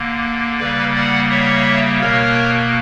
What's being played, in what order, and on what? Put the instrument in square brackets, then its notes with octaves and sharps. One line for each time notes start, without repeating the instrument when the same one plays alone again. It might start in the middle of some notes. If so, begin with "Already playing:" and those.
Already playing: [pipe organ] D3 A#3
C#3 G3 A#3 B4 D5
D5 F#5
C#5 E5
B2 A#3 A#4 C#5